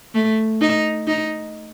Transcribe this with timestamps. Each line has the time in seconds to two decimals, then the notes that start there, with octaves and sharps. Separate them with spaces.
0.15 A3
0.61 D#4
1.08 D#4